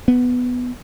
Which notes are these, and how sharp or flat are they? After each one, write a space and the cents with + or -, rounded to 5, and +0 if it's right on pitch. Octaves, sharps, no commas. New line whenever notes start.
B3 +5